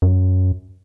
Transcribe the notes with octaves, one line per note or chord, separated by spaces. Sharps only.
F#2